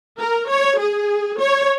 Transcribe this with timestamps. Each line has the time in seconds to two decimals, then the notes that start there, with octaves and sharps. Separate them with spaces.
0.19 A#4
0.50 C#5
0.79 G#4
1.40 C#5